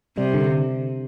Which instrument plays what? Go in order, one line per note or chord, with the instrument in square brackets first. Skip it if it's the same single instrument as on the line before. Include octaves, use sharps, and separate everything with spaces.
[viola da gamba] C3 [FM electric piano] G3
[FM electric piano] D3